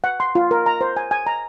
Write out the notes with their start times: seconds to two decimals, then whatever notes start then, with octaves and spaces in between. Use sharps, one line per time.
0.04 F#5
0.20 C6
0.35 F4
0.51 A#4
0.66 A#5
0.81 C5
0.97 G#5
1.11 G#5
1.26 A#5